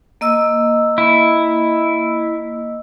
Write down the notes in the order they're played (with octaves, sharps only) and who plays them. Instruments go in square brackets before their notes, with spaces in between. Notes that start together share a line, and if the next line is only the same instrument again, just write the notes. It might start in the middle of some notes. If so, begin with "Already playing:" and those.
[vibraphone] A#3 D#5 E6
[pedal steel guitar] E4